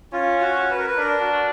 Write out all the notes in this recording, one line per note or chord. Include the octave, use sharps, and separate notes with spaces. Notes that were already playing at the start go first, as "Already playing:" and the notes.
C#4 F4
F#4
B4
A#4
B4
D4 A#4
F#4